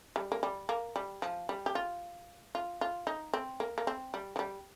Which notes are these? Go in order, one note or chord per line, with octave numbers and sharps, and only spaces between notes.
G3
A#3
G3
A#3
G3
F3
G3
G4
F4
F4
F4
D#4
C4
A#3
A#3
C4
G3
F3
G3